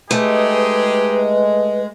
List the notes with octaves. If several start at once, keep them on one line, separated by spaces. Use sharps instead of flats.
G#3 A3 D#4 G4 G#4 B4